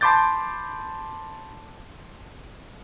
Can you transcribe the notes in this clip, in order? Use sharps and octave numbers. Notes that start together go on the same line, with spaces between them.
A5 B5 C6 D6 G6 A6